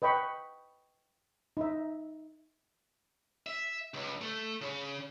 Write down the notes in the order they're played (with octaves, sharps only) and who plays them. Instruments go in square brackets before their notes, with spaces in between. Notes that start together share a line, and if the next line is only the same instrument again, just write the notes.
[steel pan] B4 D#5 G5 B5 C#6
D#4 E5
[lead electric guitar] E5
C#2
A3
C#3